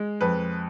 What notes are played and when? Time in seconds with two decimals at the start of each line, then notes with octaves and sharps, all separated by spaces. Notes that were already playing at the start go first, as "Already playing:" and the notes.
Already playing: G#3
0.21 F2 B4